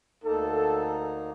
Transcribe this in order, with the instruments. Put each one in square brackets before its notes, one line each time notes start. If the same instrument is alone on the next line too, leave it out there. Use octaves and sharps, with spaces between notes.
[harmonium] D2 A#3 D#4 [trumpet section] A4